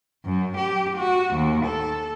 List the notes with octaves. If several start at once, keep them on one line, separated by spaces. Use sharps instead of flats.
F#2
G4
F#4
D#2
A4